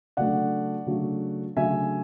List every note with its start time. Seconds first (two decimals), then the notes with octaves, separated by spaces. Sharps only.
0.17 C#3 F#3 A3 D4 D5 F#5
0.86 C#3 F#3 A3 D4
1.57 C#3 F#3 A3 D4 E5 G#5